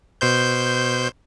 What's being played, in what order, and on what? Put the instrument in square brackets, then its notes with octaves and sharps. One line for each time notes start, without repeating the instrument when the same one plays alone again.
[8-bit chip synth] B2 C5 G6